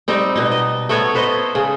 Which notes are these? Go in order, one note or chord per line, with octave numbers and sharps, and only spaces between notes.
G3 C4 D#4
B2 D#4
D#5
A3 B3 F#4 C#5
A4 B4 C5 D#5
C#3